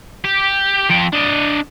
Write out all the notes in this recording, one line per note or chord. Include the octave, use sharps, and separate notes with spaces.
G4
F3 G5
D4 D#5